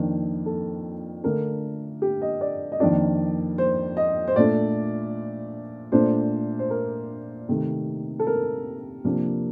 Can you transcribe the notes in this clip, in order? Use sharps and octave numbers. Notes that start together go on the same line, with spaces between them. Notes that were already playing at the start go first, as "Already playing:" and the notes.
Already playing: F2 D#3 A#3 D4
A4
D3 A3 D4 A#4
G4
D#5
D5
D#5
F2 D#3 A#3 D4 D5
C5
D#5
C5
A#2 A3 D4 D5
A#2 A3 D4 C5
C5
A#4
C3 D#3 A3
A4
A#4
C3 F3 A#3 D4